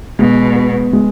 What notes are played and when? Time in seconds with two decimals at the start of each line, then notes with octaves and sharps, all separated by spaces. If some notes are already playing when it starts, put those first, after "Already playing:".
0.19 B2 G#3
0.55 B3
0.93 G#3